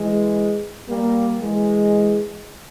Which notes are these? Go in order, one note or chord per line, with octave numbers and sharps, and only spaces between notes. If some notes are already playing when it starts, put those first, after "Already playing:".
Already playing: E3 G#3
G3 A#3
E3 G#3